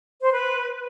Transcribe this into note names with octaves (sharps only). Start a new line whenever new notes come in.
C5
B4